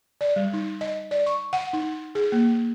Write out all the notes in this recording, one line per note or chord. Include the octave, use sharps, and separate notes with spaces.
D5
G3
D#4
D#5
D5
C#6
F#5
D#4
G#4
A#3